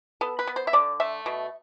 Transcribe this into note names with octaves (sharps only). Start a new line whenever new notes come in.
B3 A4
B4
B3
C5
E5
D3 D5
A3 E5
B2